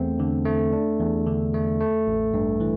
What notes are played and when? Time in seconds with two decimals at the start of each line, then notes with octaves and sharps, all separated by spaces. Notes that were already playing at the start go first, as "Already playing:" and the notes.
Already playing: E2 A3 C4
0.20 D3
0.45 A3
0.73 D4
1.00 E2
1.26 D3
1.54 A3
1.81 A3
2.07 A1
2.34 G2
2.60 E3